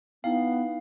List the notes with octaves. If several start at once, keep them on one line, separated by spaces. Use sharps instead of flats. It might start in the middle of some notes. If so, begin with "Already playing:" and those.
B3 D#4 E4 F5 G5